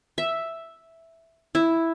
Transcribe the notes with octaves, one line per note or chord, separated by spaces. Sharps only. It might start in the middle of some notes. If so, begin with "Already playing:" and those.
E5
E4